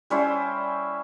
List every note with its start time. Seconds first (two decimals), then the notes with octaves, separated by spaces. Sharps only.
0.10 G3 C#4 E4 C5